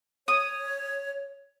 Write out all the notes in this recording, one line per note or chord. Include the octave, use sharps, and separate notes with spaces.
C#5 D#6